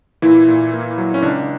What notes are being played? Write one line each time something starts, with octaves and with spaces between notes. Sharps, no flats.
A#2 E3 E4
A#2
A#3
F#3
C#4
C#2 D4